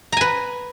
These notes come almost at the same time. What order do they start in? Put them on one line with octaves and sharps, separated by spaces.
A#5 G#5 B4